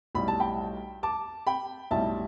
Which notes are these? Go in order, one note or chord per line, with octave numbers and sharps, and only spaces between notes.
B1 A2 G3 B5
A5
G5 B5
A5 D6
G5 B5
B1 A2 G3 E5 A5